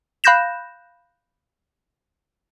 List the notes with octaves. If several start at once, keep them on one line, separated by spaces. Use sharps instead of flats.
F5 B5 F#6 G6 A#6 E7